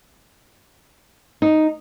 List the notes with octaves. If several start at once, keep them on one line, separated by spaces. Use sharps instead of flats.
D#4